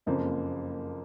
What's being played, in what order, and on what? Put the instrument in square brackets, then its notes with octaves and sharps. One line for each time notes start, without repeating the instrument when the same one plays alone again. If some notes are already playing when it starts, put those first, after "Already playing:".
[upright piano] F#1 F2 C#3 F3 A#3